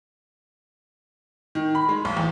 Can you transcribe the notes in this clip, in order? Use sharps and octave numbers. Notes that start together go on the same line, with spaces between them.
D#3
B5
G#3
B1
E2